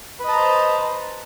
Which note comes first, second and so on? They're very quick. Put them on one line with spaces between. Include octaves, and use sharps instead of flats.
B4 D#5 A5 A#5 C5